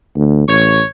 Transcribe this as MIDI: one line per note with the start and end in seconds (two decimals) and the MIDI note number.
0.16 0.47 38
0.48 0.81 33
0.48 0.85 73